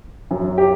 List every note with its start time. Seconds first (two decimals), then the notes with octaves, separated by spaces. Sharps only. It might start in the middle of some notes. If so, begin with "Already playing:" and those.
0.31 F#2 F#3
0.58 G4